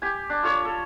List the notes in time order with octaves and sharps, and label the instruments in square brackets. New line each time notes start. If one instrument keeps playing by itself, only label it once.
[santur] G4 G#5
D4
F4 A4 C#5
A4